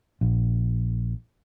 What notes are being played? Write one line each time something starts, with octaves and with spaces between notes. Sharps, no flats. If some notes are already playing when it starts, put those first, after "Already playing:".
A#1